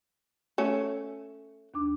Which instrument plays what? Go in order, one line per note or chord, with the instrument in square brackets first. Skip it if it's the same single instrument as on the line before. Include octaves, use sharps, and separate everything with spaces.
[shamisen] A3 C#4
[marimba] D#2 D4 D6